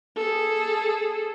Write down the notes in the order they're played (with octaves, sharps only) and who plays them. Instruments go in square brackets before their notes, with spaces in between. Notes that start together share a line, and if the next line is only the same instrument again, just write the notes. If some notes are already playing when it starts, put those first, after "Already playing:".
[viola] G#4 A4